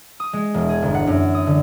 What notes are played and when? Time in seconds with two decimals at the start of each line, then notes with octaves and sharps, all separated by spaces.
0.20 D#6
0.33 G#3
0.54 E1
0.69 G#4
0.82 G1
0.94 F#5
1.07 F#2
1.35 D#6
1.47 D3